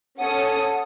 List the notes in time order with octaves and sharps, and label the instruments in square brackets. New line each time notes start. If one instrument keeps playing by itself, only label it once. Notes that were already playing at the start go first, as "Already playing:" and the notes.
[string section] C#4 A4 D#6 [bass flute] F#5